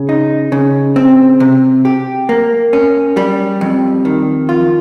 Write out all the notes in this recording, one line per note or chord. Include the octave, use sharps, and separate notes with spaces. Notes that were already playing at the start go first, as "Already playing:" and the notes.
Already playing: C#3
D#4
C#3
C4
C3
G4
A#3
C#4
G3
F2
D#3
F4